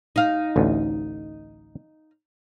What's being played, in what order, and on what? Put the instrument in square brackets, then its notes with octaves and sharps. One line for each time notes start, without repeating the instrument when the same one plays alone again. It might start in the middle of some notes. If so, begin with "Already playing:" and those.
[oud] D#4 F5
[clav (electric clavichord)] A1 D2